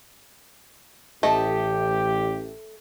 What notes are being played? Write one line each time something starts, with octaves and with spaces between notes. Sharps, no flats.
A1 A3 G4 D#5